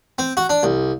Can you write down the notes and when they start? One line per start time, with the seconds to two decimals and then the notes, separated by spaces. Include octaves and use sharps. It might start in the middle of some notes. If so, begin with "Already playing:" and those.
0.18 C4
0.37 F#4
0.49 D4
0.63 C2